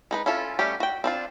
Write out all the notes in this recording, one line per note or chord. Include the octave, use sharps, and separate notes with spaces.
G#3 D#4 B4
C#4 E4 F4 A4
G3 A3 C#4 G4
F#4 G5
C4 D4 F4